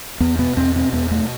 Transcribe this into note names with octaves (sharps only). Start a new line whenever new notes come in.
E2 B3
B2 B3
E2 C4
B2 C4
E2 B3
B2 A3